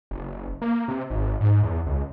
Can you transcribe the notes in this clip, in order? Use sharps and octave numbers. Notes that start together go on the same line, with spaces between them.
F#1
A#3
C3
G#1
G#2
E2
C#2